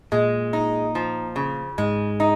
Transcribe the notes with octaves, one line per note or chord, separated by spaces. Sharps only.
A#2 G#3
D#4
F3
C#3
G#2 G#3
D#4